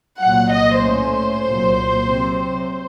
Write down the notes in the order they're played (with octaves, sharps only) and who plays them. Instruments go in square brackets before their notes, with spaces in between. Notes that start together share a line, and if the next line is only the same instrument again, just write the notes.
[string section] C2 A#2 F#3 F#5
D#5
A2 A3 C#4 C5
C2 A#2 F#3
C3 F#3 C4